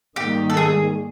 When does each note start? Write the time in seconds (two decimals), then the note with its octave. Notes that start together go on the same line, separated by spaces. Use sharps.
0.16 G#2 D#3 G3 A#3 D#4 G4
0.50 A4
0.57 G#4